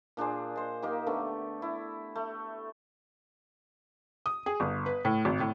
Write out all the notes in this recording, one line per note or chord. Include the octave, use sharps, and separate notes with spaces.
A#2 D4 G#4 C5
C5 D#5
A#3 D#4 G4
D3 A3 B3
E4
A3
D#6
G#4
G1
B4
A2
G#1
A2